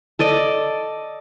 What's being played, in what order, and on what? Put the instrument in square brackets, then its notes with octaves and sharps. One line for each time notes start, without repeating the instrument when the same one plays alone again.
[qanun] A4 D5 D#5